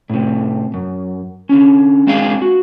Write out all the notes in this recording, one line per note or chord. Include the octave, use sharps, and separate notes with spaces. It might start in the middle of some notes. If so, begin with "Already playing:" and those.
A2 C3
F#2
D3 C#4
G#3 C4 D4 G#4 D5 F5
F#4